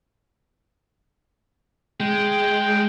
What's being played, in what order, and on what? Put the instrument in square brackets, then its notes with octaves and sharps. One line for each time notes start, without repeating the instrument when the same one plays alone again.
[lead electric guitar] G#3 [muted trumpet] G5